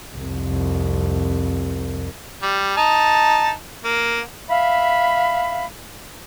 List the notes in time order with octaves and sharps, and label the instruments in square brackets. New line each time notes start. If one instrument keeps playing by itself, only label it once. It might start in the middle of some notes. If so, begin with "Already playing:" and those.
[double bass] C2 F2
[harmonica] G3
D#4 A5
A#3
[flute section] E5 F5 B5